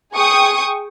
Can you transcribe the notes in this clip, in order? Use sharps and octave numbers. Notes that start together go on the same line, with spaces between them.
G#4 G5 C#6 D#6